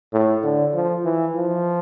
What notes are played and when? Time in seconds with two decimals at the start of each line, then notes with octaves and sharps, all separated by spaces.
0.13 A2
0.43 D3
0.74 F3
1.04 E3
1.35 F3